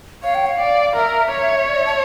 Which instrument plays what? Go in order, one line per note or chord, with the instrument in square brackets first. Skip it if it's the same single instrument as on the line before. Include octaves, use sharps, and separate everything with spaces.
[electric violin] C#5 [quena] F5
[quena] G5
F5
[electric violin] D5
[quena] F5
[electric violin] A#4 [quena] E5
[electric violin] C#5
[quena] D5
E5
A5